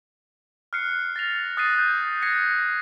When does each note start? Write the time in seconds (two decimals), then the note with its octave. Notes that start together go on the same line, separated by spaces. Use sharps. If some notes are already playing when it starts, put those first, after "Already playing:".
0.73 F6 F#6 C7 C#7
1.16 A6 A#6 F7
1.57 D#6 F#6 A6 A#6 C7 D#7
1.78 G6
2.22 G#6 A#6 C7 C#7